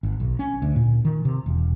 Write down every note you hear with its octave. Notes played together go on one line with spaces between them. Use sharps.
G#1
B1
C#4
D2
A#2
D#3
C3
E1